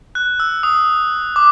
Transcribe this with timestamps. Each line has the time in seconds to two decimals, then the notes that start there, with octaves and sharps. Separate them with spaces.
0.15 F#6
0.40 E6
0.63 D#6
1.36 D6